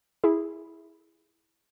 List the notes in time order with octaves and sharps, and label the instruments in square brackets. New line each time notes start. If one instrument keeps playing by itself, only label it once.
[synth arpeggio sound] E4 G#4